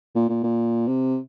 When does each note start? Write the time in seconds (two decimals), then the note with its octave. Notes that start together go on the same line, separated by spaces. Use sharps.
0.15 A#2
0.29 A#2
0.44 A#2
0.87 C3